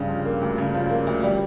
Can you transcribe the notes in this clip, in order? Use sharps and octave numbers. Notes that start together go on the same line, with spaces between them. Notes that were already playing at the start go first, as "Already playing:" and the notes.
Already playing: G2 C#3
F3
A#3
D2
C#3
F3
A#3
D2
G3